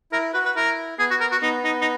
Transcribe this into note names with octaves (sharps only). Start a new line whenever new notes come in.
E4 A#4
F#4 B4
B4
E4 A#4
B3 G#4
F#4
A#4
F#4
B3 D#4
D#4
D#4